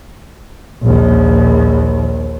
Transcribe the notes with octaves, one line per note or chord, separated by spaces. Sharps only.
A#1 D#2